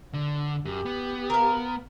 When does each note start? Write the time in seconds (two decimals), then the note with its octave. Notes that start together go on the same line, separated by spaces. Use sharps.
0.14 D3
0.65 F#2 G4
0.85 B3
1.30 A#4 F5